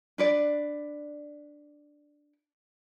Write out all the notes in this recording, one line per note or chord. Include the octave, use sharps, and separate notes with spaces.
D4 B4 D5